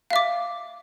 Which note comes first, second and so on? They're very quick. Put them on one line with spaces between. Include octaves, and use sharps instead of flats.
F5 E5 D6